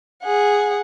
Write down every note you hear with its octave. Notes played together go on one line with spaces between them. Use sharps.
G#4 F#5